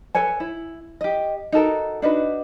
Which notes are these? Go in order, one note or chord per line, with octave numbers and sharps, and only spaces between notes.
A4 B4 C#5 G#5
E4
G4 D#5
D#4 F#4 A4 A#4
D4 D#4 F#4 B4